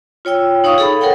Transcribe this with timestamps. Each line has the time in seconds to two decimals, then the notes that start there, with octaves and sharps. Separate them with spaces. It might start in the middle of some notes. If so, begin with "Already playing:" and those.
0.25 F4 C#5 G5 E6
0.64 D#4 C#5 F5 C#6 D#6
0.78 G#4 A4 B5
1.01 A4 A#4 C#5 F#5 G5